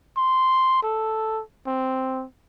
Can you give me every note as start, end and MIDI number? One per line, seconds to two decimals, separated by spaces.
0.17 0.80 84
0.83 1.43 69
1.67 2.25 60